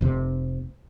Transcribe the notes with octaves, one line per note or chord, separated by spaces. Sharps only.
F1 C3